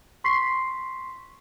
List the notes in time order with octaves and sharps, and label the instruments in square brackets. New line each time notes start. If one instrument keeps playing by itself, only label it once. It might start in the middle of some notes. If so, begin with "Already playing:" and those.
[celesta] C6 C#6 B6 C7